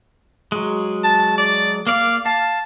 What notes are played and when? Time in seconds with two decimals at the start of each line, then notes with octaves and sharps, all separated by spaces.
0.52 F#3 G#3
1.04 A5
1.38 D5
1.87 A#3 D5 F5 D6
2.26 F5 A5